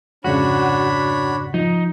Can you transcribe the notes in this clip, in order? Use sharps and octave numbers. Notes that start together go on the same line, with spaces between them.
F2 G#2 C#3 D4 F#4 C#5 B5
F3 D#4